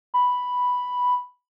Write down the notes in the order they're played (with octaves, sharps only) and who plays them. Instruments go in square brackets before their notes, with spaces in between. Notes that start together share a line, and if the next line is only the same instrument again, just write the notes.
[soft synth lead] B5